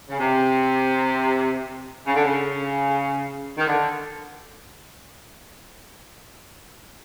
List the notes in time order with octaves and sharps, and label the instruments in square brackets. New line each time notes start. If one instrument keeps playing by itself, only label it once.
[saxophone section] C#3
C3
C#3
D3
C#3
D#3
D3